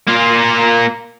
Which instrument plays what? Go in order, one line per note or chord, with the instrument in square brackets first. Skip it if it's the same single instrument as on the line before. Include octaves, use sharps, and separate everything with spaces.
[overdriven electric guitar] A#3 F4